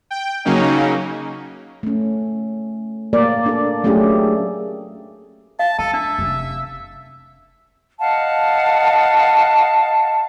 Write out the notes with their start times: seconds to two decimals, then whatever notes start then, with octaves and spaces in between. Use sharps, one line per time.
0.11 G5
0.45 C#3 F#3 A#3 C#4 D#4
1.83 A3 C#4
3.13 A#3 A#4 D5
3.46 D4 A4
3.84 F#3 A3 C#4 D4 G4 G#4
5.59 F5 A5
5.79 G#3 A4 A5
5.93 D4 E5
6.18 F1 C#4
7.99 D#5 F5 F#5 A5